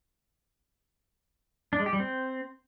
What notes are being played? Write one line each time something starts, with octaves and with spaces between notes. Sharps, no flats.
D4
G#3
G4
G3
C4